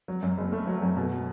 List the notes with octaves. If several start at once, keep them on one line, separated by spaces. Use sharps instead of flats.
F#3
F#2
F#1
A3
F#3
F#2
B2